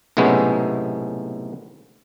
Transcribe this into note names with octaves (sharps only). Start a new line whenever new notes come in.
B1 A2 C3 G#3 B3 C#4